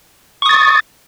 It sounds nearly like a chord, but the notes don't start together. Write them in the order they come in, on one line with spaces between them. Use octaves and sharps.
C#6 D#6 A6